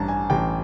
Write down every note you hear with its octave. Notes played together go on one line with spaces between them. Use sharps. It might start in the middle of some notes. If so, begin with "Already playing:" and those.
Already playing: A1 G2 A5 A#5
G#5
A1 G5